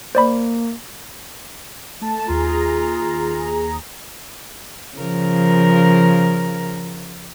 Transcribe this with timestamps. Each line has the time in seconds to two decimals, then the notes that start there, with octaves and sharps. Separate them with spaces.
0.15 A#3 C5 D5 B5
2.01 A3 A5
2.28 D#2 F4 G#4 A#5
4.97 C#3 F3 A#4